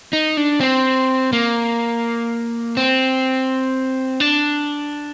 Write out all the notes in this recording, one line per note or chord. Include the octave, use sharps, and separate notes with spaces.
D#4
D4
C4
A#3
C4
D4